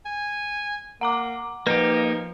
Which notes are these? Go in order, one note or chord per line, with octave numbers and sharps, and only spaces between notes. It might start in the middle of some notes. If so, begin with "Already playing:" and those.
G#5
A#3 F#5 A#5 D6
F3 A#3 D#4 G4 B4